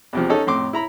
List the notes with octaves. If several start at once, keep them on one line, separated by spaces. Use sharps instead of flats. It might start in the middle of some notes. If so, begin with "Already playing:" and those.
E2 C3 F3
C#4 D#4 A4
F2 A2 C6 D6
E4 A#5 B5